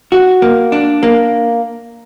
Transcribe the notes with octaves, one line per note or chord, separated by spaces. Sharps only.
F#4
A#3
D4
A#3